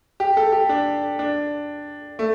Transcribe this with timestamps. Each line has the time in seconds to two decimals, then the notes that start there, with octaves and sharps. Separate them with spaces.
0.20 G4
0.37 A4
0.52 G4
0.69 D4
1.19 D4
2.19 A3